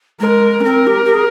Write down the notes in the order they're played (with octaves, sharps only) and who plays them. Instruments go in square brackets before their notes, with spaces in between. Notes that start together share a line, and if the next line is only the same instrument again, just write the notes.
[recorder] G#3 [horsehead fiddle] A#4
[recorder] C#4
[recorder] C4 [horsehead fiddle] A#4
[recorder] G4
G4
G#4